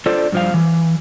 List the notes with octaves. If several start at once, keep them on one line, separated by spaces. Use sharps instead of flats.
D4 F4 A4 C5 D5
G2 F3 F5
E3